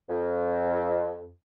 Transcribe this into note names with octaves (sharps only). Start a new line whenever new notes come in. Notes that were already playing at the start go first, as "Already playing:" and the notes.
F2